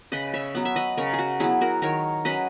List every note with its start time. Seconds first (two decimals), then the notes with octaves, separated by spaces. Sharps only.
0.12 C#3 B4 D#5
0.34 C#5 E5
0.55 F#3 B3
0.65 E5
0.76 B4 D#5
0.97 C#3 A#4 C#5
1.13 G#4
1.18 F#4
1.40 F#3 B3 E4 G#4
1.61 F#4 A#4
1.82 D#3 A#4 C#5
2.25 F#3 C#4 B4 D#5